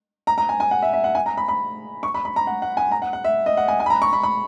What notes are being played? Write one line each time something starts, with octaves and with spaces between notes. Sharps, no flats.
A#5
A#5
G#5
G#5
F#5
E5
E5
F#5
G#5
A#5
B5
B5
C#6
B5
B5
A#5
F#5
F#5
G#5
A#5
F#5
F#5
E5
D#5
F#5
G#5
G#5
B5
A#5
C#6
B5
B5